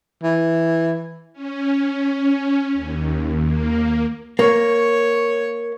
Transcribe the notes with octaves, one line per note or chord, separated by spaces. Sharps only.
E3
C#4
D#2
A#3
A#3 C#5